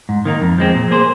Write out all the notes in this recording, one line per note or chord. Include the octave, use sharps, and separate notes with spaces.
G#2
D#3 A#3 D#4
F2
F3 G#3 C4
A#2
A#3 G#4 C5